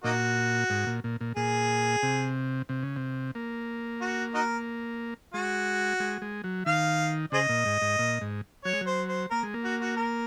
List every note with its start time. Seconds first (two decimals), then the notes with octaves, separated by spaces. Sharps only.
0.04 A#2 A#3 D#4 F#4
0.70 G#2
0.87 A#2
1.04 A#2
1.21 A#2
1.36 A#2 G#4
2.03 C3
2.69 C3
2.83 C#3
2.96 C3
3.35 A#3
4.01 F#4
4.34 D#4 F#4 A#4
5.34 G#3 F#4
6.00 G#3
6.22 G#3
6.44 F#3
6.66 D#3 F5
7.32 C#3 G#4 C5 D#5
7.49 A#2
7.65 G#2
7.82 G#2
7.99 A#2
8.21 G#2
8.65 F#3 C#5
8.73 G#3
8.81 F#3
8.87 C5
9.08 C5
9.30 A#3 A#4
9.43 G#3
9.54 A#3
9.64 F#4
9.81 F#4
9.97 A#4